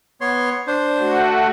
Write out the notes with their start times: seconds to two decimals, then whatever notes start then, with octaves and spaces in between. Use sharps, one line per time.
0.21 B3 C#5 C6
0.67 D4 C5
0.99 A3 F#4